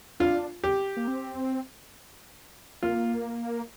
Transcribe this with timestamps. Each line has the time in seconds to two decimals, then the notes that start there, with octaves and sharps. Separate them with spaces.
0.20 D4 F4
0.64 G4
0.97 A#3
1.08 C4
2.83 A#3 F4